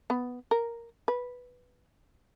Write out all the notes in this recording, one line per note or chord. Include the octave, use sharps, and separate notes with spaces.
B3
A#4
B4